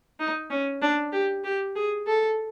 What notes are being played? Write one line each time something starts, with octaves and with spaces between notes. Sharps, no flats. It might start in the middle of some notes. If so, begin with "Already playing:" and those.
D#4
C#4
D4
G4
G4
G#4
A4